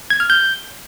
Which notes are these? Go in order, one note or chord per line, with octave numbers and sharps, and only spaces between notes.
G#6
F6
G6